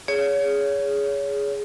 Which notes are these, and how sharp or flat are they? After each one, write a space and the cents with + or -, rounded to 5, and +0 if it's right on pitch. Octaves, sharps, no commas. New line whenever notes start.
G#4 +0 C#5 +25